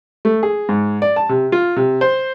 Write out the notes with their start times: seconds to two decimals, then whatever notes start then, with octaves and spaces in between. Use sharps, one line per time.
0.25 A3
0.43 G#4
0.69 G#2
1.02 D5
1.16 A5
1.29 C3
1.52 F4
1.76 C3
2.01 C5